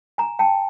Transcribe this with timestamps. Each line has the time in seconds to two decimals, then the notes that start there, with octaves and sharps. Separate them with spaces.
0.18 G#5 A#5
0.39 G5 A5